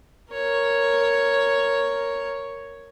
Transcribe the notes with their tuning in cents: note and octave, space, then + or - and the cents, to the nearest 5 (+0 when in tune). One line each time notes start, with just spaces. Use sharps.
A#4 +0 C#5 +0